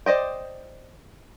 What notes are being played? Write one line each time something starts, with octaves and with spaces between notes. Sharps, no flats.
C5 D5 D#5 G5